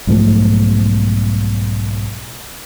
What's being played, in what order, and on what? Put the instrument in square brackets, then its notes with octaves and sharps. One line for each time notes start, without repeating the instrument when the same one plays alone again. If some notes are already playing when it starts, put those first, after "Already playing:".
[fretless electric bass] B1 G#2 F3 A3